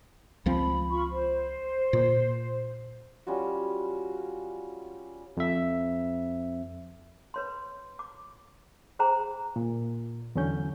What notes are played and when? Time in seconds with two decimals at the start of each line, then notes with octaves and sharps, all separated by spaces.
0.46 C#2 F3 C4 B5
0.90 F4 B5 C#6
1.10 C5
1.93 A#2
3.27 G3 C#4 F4 F#4
5.37 F2 E5
7.34 B4 C#5 C6
7.99 D6
8.99 G#4 C5 G5 A#5
9.56 A#2
10.35 E2 D3 F#3 C#4 G6